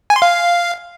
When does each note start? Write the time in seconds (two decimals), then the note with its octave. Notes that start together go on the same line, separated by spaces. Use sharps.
0.10 G#5
0.16 C6
0.22 F5